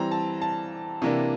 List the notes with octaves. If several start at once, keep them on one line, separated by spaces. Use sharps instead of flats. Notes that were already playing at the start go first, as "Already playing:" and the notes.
Already playing: E3 G3 C4 A#5
A5
A5
C3 E3 A#3 D4